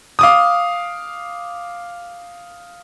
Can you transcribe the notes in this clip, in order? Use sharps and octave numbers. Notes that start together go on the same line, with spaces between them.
F5 D6 D#6